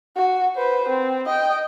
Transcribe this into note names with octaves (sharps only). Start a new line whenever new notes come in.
F#4
B4 C5
C4
D#5 G5